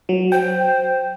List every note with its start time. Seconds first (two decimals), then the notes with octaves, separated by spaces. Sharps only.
0.09 F#3
0.32 C5 G5